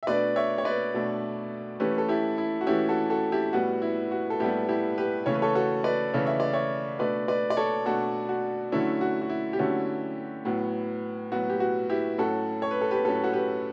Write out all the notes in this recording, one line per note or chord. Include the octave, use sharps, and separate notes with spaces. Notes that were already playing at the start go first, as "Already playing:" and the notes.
E5
B2 A3 D4 B4 D5
C#5 E5
C#5
B4 D5
B2 A3 D4
E3 A3 C#4 G4 B4
A4
E4 G4
E4
F#4
E3 A3 C#4 E4 G4
F#4 A4
F#4 A4
E4 G4
A2 G3 B3 F#4
E4
F#4
A4
A2 G3 B3 E4 G4
E4 G4
G4 B4
C#3 E3 A3 C#4 C#5
B4
A4 C#5
F#4 A4
B4 D5
C#3 E3 A3 C#4
E5
D5
C#5 E5
B2 A3 D4 B4 D5
B4 D5
D5
A4 C#5
B2 A3 D4 F#4 A4
F#4
D3 F#3 A3 C#4 E4
F#4
F#4
E4
G4
D3 F#3 A3 C#4 F#4
A2 F#3 B3
A2 F#3 B3 F#4
G4
F#4
E4 G4
A2 F#3 C#4 F#4 A4
C#5
B4
A4
G4 B4
A2 F#3 C#4 A4
B4
F#4 A4
G4 B4